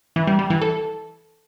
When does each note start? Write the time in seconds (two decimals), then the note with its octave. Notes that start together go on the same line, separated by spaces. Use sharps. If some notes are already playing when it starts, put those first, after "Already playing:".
0.16 E3
0.27 G3
0.39 G3
0.50 E3
0.62 A4